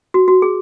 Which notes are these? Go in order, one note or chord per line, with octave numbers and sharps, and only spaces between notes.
F#4
F#4
G#4